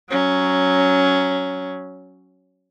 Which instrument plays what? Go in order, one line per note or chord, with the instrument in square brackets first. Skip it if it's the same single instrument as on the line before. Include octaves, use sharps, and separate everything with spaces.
[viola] F#3 C#4